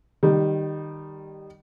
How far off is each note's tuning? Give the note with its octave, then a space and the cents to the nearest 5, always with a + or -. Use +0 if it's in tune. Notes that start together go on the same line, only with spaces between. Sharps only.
D#3 -20 G3 +0